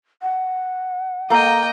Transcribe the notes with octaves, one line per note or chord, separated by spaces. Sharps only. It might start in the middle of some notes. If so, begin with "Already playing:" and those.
F#5
A#3 A4 D#5 F5 G5 A#5